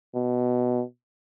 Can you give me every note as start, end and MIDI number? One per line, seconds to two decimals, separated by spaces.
0.15 0.82 47